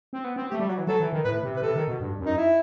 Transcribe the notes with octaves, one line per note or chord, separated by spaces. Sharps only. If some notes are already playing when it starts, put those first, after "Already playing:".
C4
B3
C4
A3 G4
G3
F#3 F#4
E3
F#3 A4
E3
D#3
A2 B4
C3
B4
C3 A4
D#3
B2
G2
F#2
D#4
E4